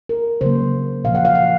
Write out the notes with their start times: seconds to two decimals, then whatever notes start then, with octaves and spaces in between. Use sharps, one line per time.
0.09 A#4
0.41 C#3 F#3 A#3 C5
1.04 A#2 F3 A#3 F5
1.15 F#5
1.25 F5
1.35 F#5